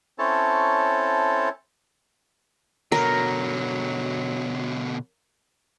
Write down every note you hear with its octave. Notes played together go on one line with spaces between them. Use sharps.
C4 C#4 E4 A4 C#5 A5
B2 D3 F#3 A#4